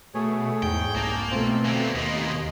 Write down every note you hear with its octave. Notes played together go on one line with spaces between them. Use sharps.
B2 A3 G#4 C#5
E2 G#2 G5
C2 A#3 A5 G6
B2 A3 C4 F4
D3 A#3 G#5
D#2 B2 A#3 D#5 C6 D7